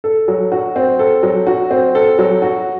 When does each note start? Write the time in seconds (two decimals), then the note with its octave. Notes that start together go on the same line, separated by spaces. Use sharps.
0.04 A4
0.28 F#3
0.52 F#4
0.76 C4
0.99 A4
1.23 F#3
1.47 F#4
1.71 C4
1.95 A4
2.19 F#3
2.42 F#4